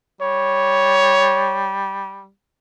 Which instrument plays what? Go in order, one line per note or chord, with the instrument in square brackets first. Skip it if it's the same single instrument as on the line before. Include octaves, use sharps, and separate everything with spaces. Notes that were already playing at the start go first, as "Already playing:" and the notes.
[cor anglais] G3 [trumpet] C#5